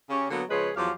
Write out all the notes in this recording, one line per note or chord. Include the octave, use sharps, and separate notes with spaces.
C#3 C#4 G4
D3 F#3 A#3 B3
C#3 F3 G#3 G#4 B4 C#5
E2 F3 F#3 G4 F5